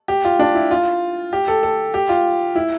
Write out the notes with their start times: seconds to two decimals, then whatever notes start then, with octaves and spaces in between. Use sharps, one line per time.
0.08 G4
0.25 F4
0.39 D4
0.55 E4
0.71 F4
1.33 G4
1.48 A4
1.63 A4
1.94 G4
2.09 F4
2.55 E4